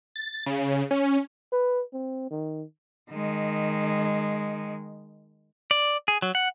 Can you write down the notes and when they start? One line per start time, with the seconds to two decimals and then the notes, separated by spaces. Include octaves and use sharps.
0.16 A6
0.46 C#3
0.91 C#4
1.52 B4
1.93 C4
2.31 D#3
3.11 D#3 G#3
5.71 D5
6.08 G#4
6.22 F#3
6.35 F#5